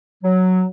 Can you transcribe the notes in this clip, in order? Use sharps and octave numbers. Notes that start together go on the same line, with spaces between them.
F#3